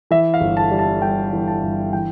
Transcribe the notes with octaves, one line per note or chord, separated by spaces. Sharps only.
E3 E5
F5
G1
A5
G3
A5
G2 G5
E3
A5
G1
E3 G5